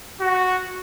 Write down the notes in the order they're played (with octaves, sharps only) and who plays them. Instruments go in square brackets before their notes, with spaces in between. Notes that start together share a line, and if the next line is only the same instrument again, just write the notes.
[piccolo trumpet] F#4